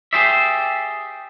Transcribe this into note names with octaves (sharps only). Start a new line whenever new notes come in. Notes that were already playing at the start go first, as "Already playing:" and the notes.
G4 G#4 C5 D5 E5